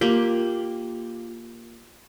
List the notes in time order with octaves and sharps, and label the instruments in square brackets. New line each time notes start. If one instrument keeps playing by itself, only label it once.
[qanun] A#3 G4 G5 [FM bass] F4